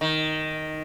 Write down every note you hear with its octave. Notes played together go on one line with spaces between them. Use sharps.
D#3